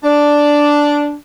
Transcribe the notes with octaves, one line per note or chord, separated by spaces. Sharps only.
D4